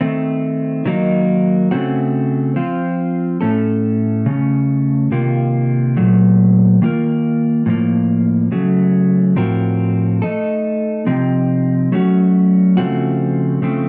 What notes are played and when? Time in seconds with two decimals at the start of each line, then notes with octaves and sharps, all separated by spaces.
0.01 D#3 A3 C4
0.85 D#3 F#3 A#3 D#4
1.71 C#3 A3 C4 F#4
2.56 F3 C4 F4
3.41 A2 A3 C#4 A4
4.26 C#3 A3 C#4
5.11 C3 D#3 A#3 F4
5.97 A#2 F#3 A3
6.82 D#3 A#3 F4 A#4
7.66 A2 F3 A#3
8.52 C#3 F#3 A3
9.36 A2 F3 C4 F#4 A#4
10.22 A3 D#4 A4
11.06 C3 F3 C4 D#4
11.92 F#3 A3 C#4 F#4
12.77 C#3 F3 A3 C4 F#4
13.62 C#3 F3 A3 C4